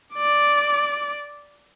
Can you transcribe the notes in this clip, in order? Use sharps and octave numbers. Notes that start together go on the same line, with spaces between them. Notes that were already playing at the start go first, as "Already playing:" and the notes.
D5 D6